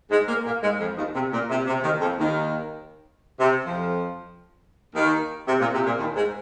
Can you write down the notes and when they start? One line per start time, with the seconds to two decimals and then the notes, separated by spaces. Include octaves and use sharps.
0.10 G#2 G#3
0.28 A#2 A#3
0.45 A#2 A#3
0.62 G#2 G#3
0.79 F2 F3
0.97 D#2 D#3
1.14 C3
1.32 A#2
1.49 C3
1.66 C3
1.83 D#2 D#3
2.00 F2 F3
2.18 D#2 D#3
3.39 C3
3.65 F2 F3
4.94 D#2 D#3
5.47 C3
5.60 A#2
5.73 C3
5.86 A#2
5.98 D#2 D#3
6.15 G#2 G#3